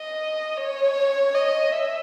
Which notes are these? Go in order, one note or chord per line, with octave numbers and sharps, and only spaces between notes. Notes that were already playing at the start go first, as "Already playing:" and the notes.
Already playing: D#5
C#5
D#5
E5